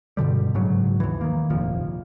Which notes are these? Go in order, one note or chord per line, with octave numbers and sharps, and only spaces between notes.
G2 B2 D3 G3
A#1 G#2 C#3 F#3
D#2 E3
D#3 A#3
F1 A#1 D#2 F3